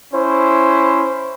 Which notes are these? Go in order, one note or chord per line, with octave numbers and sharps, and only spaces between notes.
C#4 E4 C5